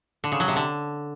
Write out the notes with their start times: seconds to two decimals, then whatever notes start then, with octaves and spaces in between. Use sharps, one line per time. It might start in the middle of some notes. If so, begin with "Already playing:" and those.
0.24 D3
0.32 C#3
0.40 F#3
0.48 C3
0.56 D3